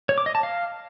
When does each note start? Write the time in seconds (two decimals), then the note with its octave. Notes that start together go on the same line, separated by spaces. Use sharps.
0.09 C#5
0.18 D6
0.26 D#5
0.35 A5
0.43 F5